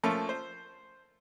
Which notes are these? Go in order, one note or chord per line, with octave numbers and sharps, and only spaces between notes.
F3 A3 A#3 C#4 F4
C5